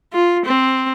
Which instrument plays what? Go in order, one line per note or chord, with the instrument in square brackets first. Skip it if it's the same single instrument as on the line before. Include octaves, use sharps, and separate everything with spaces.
[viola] F4
C4